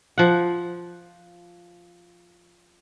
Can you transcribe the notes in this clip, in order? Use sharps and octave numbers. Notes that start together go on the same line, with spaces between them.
F3 F#5